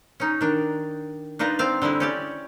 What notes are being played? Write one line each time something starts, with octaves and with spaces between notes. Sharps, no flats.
C#4 D#4
D#3 D4
D4 D#4 F4 B4 D#5
C4 F5
D3 G3 G#3 E4
C#4 G4 D5